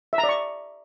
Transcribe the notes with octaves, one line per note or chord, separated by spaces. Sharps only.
E5
A#5
D5
C#6